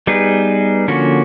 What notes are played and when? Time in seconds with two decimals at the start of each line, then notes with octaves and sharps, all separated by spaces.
0.07 G3 B3 D#4 G#4 B4
0.88 D3 F3 A#3 C#4 F#4